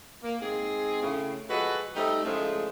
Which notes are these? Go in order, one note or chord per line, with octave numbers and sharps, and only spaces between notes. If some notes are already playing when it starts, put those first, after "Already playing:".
A#3
G#2 C4 G#4
A2 C#3
F3 G#3 F#4 A4 B4
G3 A3 C4 D#4
A2 C#3 F3 G#3 A3